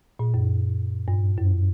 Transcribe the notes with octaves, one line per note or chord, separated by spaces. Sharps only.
A#2
F#2
G2
F#2